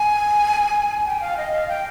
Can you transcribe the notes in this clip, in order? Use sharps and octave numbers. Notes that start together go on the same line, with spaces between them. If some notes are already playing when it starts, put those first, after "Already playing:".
Already playing: G#5
G5
F5
D#5
F5
G5